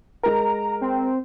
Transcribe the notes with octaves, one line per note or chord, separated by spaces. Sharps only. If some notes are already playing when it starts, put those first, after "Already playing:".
G#3 A#4 A#5
C4